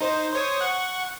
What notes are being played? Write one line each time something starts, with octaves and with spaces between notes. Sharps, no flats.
D#4 C5
C5 C#5 D#6
F#5 C#6